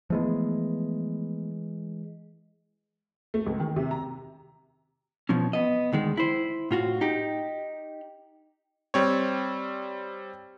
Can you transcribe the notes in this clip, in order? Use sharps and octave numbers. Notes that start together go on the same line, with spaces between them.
E3 F3 G#3 A3 B3
A3
C#2
D#3
C3
A#5
B2 F3 C#4
B3 D#5
D2 D#3 G#3
E4 C5
A2 F4 F#4
D#4 G4
G3 C4 C#5